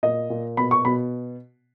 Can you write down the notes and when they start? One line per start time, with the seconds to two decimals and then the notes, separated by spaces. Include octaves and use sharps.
0.03 A#2 D#5
0.30 A#2
0.57 B2 B5
0.71 C#6
0.85 B2 B5